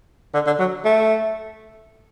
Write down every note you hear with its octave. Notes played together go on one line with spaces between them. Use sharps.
D3
D3
F#3
A3